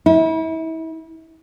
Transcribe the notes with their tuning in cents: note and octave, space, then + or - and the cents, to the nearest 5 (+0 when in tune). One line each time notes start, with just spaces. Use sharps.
E4 -35